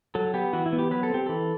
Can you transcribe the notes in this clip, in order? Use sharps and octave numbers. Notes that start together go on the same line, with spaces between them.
F#3 A4
B3 G4
E3 F#4
E4
B3
G4
F#3 B4
A4
C4 G4
E3 A4